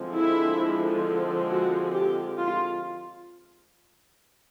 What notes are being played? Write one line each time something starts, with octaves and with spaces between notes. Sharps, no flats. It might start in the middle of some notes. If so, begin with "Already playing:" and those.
Already playing: D3 F3 G#3 C4
E4
F#4
G4
F4